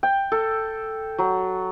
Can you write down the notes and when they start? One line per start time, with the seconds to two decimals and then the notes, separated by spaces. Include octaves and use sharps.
0.03 G5
0.32 A4
1.18 F#3